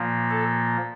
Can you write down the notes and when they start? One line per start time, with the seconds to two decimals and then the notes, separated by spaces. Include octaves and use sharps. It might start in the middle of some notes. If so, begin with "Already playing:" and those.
Already playing: A#2 F3 A#3
0.31 A4